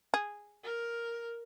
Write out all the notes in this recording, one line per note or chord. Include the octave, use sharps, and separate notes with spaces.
G#4
A#4